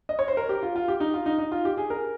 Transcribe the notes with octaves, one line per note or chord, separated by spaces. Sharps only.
D#5
C#5
C5
A#4
G4
F4
F4
G4
D#4
F4
D#4
D#4
F4
G4
G#4
A#4